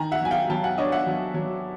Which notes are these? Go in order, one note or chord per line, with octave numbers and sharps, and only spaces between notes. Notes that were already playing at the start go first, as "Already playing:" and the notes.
Already playing: D#3 G#5 A#5
E5 F#5
F#3 G#5
F5 G5
F#3 G5 A5
F#5 G#5
D4 C#5 D#5
E5 F#5
F#3
F#3